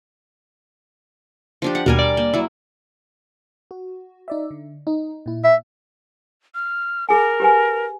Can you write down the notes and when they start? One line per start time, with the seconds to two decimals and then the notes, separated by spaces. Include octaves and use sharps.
1.62 F3 D4 G4
1.75 F#5
1.86 D#2 B2 G3 A#4 G#5
1.99 D5
2.17 A#3
2.34 F#3 E4
3.71 F#4
4.28 D#4 D5 E5
4.51 D3
4.87 D#4
5.26 A#2 E4
5.44 E5
6.55 F6
7.09 G#4 A#4 G#5
7.40 G4 B4 G#5